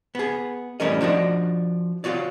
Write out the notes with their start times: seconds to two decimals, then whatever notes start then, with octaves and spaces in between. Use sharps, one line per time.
0.15 B3 G#4
0.80 E3 G3 A3 C#4 A#4 D#5
1.01 F3 D4 F#4 D#5
2.04 F4 F#4 C#5 D5